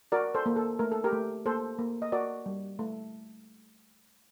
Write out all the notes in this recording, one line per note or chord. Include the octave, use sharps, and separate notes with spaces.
F#4 A#4 D5
A4 C5
A#3
A4
A3 A#4
A4
G4 A#4
A3
A#3 A4 C5
A#3
D#5
F#4 A#4 D5
G3
A3